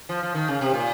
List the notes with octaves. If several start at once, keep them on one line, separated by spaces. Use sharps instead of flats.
F3
F3
D#3
C#3
C3
A#2